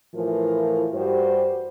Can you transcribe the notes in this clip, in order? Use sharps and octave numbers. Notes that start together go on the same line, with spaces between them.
A2 E3 F3 E4 F4 A#4
G2 F#4 G4 B4 C5